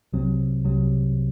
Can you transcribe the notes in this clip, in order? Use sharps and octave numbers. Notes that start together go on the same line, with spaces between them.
C2 C3 F#3 C4
C2 C3 F#3 C4